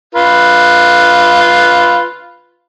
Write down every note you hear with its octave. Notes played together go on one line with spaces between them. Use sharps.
F4 B4